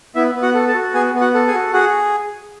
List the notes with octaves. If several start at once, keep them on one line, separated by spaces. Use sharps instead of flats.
B3 E4 E5
B3
F#4 F#5
A4
A4 A5
F#4
B3 G#4 G#5
B3
F#4 F#5
A4
G#4 G#5
F#4
F#4 G#4 F#5